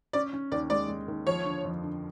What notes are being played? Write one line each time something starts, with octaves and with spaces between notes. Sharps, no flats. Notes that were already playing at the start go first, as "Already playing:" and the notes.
C#4 D5
C#4
D#2 D5
G#3 D5
G#3
D#2
F3 C#5
D3
F2
D3